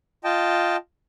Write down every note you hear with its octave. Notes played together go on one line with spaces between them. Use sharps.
F4 D#5 G5 A5